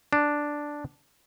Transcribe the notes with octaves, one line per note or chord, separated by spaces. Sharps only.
D4